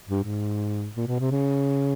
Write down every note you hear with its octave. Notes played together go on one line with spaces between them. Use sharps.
G2
G#2
A#2
B2
C3
C#3